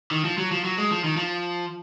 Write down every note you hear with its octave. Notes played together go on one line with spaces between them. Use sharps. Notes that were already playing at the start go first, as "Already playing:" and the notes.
D#3
F3
F#3
F3
F#3
G#3
F3
D#3
F3